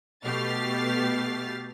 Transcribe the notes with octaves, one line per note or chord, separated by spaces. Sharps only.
B2 A3 G4 F6 A6 C7